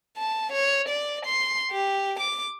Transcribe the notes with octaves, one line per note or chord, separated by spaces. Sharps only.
A5
C#5
D5
C6
G4
D6